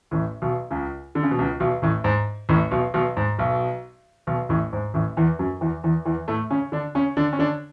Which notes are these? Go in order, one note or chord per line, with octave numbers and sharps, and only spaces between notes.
A1 A2
B1 B2
C#2 C#3
D3
C#3
B2
C#2 C#3
B1 B2
A1 A2
G#2
A1 A2
B1 B2
B1 B2
G#2
B1 B2
B1 B2
A1 A2
G#2
A1 A2
E2 E3
F#2 F#3
E2 E3
E2 E3
E2 E3
A2 A3
C#3 C#4
D3 D4
C#3 C#4
D3 D4
C#4
D3 D4